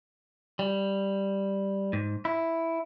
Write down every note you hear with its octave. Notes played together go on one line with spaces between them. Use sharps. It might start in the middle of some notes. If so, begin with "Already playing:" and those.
G3
G#2
E4